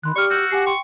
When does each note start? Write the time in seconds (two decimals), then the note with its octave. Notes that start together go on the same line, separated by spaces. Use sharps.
0.03 D#3 B5 C6 F#6
0.16 G4 D5 C#6 F6
0.31 F#4 E6 F6 G6
0.51 G4 F#5 G#5 C7
0.66 G5 C6 C#6